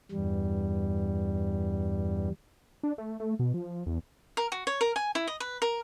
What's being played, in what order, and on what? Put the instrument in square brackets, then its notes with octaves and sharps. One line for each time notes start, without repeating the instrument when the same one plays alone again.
[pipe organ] E2 G2 G3
[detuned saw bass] D4
A3
A3
B2
F3
E2
[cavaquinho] A#4
F#4
C#5
A#4
G#5
E4
D#5
B4
A#4